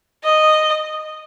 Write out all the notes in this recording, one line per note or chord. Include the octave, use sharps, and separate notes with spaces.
D#5